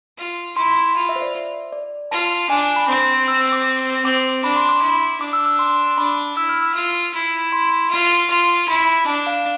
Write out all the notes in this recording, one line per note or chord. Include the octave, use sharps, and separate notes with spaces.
F4
E4 C6
F4 B5
E5
C5
D5
D5
F4 A5
D4 G#5
B5
C4 C6
E6
E6
D6
C4 D6
D4 B5
C6
D6
E4
D4 D6
E6
E6
C6
D4 B5
E4 E6
F6
E6
F4
E4
C6
F4
F4 C6
E4 B5
D4 A5
F5